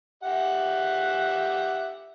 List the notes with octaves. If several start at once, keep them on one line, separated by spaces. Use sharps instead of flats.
G4 E5 F#5